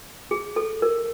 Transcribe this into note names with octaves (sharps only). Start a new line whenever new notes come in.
G#4
A4
A#4